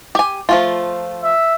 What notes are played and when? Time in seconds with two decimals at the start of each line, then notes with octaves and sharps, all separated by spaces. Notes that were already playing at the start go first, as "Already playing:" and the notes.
0.15 G4 G#5
0.49 F3 A3 F4
1.24 E5